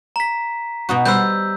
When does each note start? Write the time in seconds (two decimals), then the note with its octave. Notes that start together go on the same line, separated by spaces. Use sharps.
0.16 A#5 B6
0.89 B2 D#4 F#4
1.05 G3 B4 C5 E6 G6